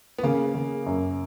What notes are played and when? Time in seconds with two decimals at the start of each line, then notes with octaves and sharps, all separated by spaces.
0.18 B3
0.23 C#3 A#3
0.55 C#3
0.86 F#2